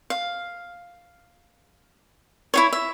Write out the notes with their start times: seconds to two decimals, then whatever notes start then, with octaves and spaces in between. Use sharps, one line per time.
0.10 F5
2.54 E4 F4 C#5
2.73 E5